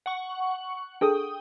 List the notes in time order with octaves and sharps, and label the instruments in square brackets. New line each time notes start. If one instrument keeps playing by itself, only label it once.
[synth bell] F#5 C#6
[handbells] D4 G#4 A4 [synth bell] G5 D#6